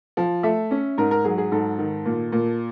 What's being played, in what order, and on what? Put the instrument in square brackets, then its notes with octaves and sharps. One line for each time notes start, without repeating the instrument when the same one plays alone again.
[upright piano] F3
A3 E5
C#4
G#2 A#4
A#4
F#3 G#4
G#4
G#2 A4
D#3
A#2
A#2